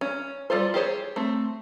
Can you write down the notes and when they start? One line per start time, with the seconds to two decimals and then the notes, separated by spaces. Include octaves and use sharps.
0.01 C#4
0.50 G3 F4 A4 C5
0.74 G4 G#4 C5 C#5
1.16 A3 C4